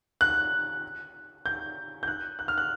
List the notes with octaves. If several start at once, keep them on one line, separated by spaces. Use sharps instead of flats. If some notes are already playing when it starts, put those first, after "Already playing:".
F#6
G6
G6
F#6
F#6
F6
F#6